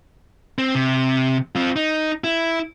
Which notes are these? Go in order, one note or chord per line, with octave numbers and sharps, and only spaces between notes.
C4
C3
C4 F4
D#4
E4